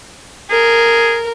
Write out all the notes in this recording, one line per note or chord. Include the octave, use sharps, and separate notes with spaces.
G#4 A#4